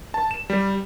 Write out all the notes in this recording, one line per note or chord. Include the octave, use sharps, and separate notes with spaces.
A5
E7
G3